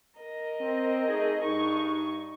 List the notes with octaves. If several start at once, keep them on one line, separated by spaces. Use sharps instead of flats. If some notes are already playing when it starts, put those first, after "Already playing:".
A#4 D#5
C4
A3 D#4 G#4
G2 D#4 C#6